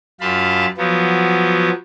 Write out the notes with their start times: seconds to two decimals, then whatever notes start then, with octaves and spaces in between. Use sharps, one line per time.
0.21 F#2 F4 F5 A5 B5
0.77 F3 F#3 B3